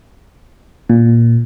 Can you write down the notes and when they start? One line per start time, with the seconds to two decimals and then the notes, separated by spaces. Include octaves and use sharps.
0.89 A#2